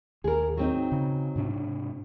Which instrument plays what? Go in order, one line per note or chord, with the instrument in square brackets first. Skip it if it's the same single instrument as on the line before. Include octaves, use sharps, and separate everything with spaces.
[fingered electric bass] D#2 [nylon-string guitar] G#4 A#4
[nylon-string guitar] F#3 C4 D#4
[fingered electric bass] C#3
G#2 C3 D4